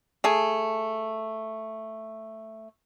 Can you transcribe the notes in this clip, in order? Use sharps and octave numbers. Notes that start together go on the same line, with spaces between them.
A3 G#4